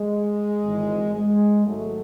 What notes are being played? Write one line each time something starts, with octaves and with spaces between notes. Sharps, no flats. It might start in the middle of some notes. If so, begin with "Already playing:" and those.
Already playing: G#3
G#1 G#2 E3
G#3
G#1 G#2 F#3 A3